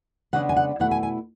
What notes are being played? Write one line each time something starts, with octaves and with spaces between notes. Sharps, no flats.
C#3 G#3 B3 D4 F#5
G#5
F#5
B2 A3 E4 F#5
G#5
G#5